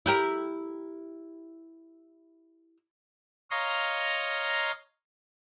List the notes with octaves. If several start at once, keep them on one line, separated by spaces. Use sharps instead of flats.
E4 G4 A#4
C#5 D#5 F5 A#5 C6